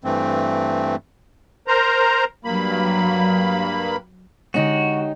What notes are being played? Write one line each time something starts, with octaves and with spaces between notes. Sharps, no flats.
G2 E3 A3 C4
A#4 C5 A#5
G2 F#3 A#3 B5
D3 G#3 C#4 D#4 F#4 G4